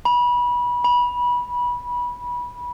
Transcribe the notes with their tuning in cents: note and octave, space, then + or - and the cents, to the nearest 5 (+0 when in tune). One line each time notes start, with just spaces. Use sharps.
B5 -25
B5 -20